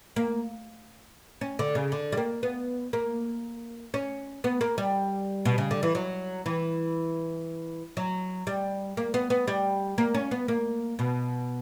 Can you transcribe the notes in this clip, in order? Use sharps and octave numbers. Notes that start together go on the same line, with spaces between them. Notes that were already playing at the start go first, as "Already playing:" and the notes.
A#3
C#4
D3
C#3
D3
G3
A#3
B3
A#3
C#4
B3
A#3
G3
B2
C#3
D3
E3
F#3
E3
F#3
G3
A#3
B3
B3
G3
A#3
C#4
B3
A#3
B2